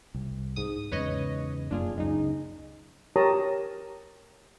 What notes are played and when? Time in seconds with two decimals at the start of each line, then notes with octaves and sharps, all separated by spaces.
0.14 C2
0.56 G#2 D#6
0.92 E2 G#2 C#3 B4 C#5 D#5
1.71 F1 F#2 A#3 D4 F4 G#4
1.98 C#2 F#2 G#3 D#4
3.16 G4 A#4 C#5 A5 A#5 D#6